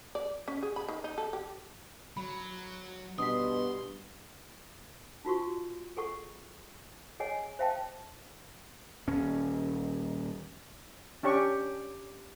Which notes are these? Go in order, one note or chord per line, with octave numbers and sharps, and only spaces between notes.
D5
C#4
G#4
B5
D#3
D#4
A4
G4
F#3 B5
G2 B2 C6 D#6 B6
D#4 F4 F#4 C#6
G#4 A4 F#5 C#6
G#4 C#5 D#5 F#5 G#5
C5 E5 F5 G5 A5
D#1 C#4
C#4 D4 G4 C#5 C#6